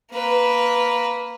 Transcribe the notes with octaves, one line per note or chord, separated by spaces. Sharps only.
A#3 B4